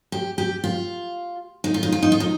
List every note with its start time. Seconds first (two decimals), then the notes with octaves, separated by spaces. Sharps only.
0.12 G4
0.38 G4
0.64 F4
1.64 D#4
1.74 F4
1.83 D#4
1.92 F4
2.03 D#4
2.12 F4
2.20 D#4